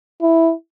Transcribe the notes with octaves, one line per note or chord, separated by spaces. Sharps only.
E4